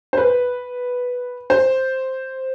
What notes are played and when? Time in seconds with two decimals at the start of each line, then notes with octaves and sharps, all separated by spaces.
0.13 C5
0.17 B4
1.50 C5